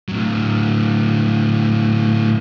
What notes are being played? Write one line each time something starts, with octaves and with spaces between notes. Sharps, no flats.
A2 F#3